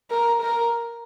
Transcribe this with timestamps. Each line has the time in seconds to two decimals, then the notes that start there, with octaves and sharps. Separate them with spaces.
0.10 A#4
0.42 A#4